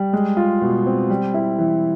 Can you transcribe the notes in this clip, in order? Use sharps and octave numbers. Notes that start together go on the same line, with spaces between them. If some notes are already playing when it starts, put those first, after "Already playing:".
Already playing: G3
G#3
F4
B2
C4
G3
E4
E3